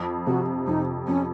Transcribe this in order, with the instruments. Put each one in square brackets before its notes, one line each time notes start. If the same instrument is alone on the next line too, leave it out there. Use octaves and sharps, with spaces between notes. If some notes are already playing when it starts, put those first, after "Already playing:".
Already playing: [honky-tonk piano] F2
[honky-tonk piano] C3 [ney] F#4
[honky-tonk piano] F2 [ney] D#4
[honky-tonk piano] F2 [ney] C#4